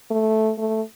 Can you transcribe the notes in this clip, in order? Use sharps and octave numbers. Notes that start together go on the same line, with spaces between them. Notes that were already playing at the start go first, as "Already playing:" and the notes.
A3
A3